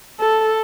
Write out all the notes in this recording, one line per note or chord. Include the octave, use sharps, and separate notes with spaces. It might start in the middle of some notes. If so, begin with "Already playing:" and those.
A4